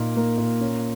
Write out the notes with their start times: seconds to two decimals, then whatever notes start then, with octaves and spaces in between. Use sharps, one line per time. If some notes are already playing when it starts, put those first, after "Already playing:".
Already playing: A#2 D#4 A#4
0.16 A#3
0.38 A#2
0.60 C#4